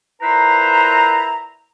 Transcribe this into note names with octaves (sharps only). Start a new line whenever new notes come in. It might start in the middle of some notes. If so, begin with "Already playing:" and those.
A#2 E4 B4 C5 E5 A#5